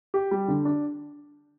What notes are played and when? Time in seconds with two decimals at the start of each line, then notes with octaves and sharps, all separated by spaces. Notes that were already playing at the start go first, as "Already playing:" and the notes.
0.14 G4
0.31 G3
0.48 D3
0.65 D4